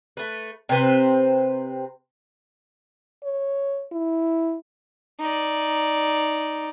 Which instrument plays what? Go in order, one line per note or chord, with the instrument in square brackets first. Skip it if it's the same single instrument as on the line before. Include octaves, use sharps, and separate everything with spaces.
[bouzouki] A3 B4
C3 C4 B4 C5
[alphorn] C#5
E4
[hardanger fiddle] D#4 D5